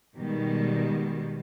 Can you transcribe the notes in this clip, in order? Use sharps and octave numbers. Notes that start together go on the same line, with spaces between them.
B2 D#3 G3 G#3